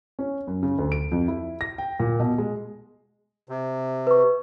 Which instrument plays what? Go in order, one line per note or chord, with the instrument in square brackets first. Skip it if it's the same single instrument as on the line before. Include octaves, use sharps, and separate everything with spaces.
[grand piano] C#4
F#2
C#3
D2
D7
F2
E4
A#6
G5
A#2
B2
G#3
[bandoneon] C3
[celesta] B4 C#6